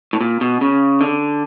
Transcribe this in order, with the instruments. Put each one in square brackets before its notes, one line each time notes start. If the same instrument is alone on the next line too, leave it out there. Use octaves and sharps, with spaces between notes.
[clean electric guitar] A2
A#2
B2
C#3
D3